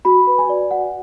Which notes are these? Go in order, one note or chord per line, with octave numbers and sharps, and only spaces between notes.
F#4 B5
B4
G#5
D5
F#4 F#5